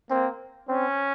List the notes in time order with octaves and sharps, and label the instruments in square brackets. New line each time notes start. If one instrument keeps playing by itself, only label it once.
[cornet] A#3 [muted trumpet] C4
[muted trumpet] C4 [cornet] C#4